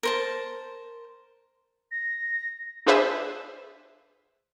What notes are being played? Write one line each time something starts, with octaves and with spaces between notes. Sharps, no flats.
A#4 C5 A5
A#6
D4 F4 G#4 B4 C5 E5